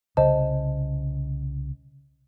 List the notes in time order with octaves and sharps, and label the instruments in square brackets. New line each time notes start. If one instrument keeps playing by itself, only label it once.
[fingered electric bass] C2 C#3 [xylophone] C5 D#5 A5